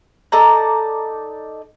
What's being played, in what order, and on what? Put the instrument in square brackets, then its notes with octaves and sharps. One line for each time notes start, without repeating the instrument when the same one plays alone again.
[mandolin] D#4 A4 D5 A#5